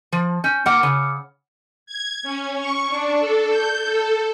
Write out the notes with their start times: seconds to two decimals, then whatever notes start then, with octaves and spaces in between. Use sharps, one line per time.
0.12 F3
0.44 C#4 G6
0.66 A#3 F#5 D6 F6 C#7
0.83 C#3
1.86 G#6
2.23 C#4
2.58 C#6
2.89 D4
3.19 A4
3.50 G6
3.84 A4